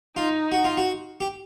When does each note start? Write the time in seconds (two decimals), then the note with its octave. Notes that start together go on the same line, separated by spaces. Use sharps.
0.16 D#4 F4
0.52 F#4
0.64 F4
0.77 F#4
1.20 G4